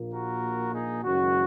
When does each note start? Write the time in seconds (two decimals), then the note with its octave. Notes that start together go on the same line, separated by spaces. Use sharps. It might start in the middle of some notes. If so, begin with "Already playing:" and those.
Already playing: A#1 A#2 A#3
0.14 F#4 A#4
0.74 D#4 G#4
1.04 F#1 F#2 D#3 G#3 C#4 F#4